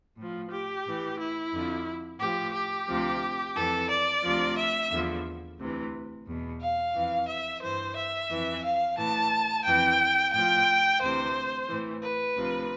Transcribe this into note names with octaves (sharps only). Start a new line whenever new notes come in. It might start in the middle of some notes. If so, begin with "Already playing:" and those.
A2 F3
G4
A2 E3
E4
F2 D3 F3
A2 F3 G4
G4
D2 C3 F3
F2 E3 A4
D5
D2 C3 F3
E5
E2 D3 F3
D2 C3 E3
E2 B2
F5
F2 E3
E5
G2 E3 C5
E5
F2 E3
F5
A2 E3 A5
F2 E3 G5
A2 F3 G5
D2 C3 E3 C5
A2 E3
B4
D2 C3 F3